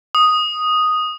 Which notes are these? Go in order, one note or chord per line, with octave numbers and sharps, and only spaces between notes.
D#6